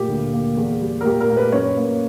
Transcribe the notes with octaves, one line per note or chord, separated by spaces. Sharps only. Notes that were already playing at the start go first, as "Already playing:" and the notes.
Already playing: A#2 A#3 G4
D2
A#3
E2
G3
A#4
A#2 G4
A#4
A#3
B4
F#2 C#5
A#3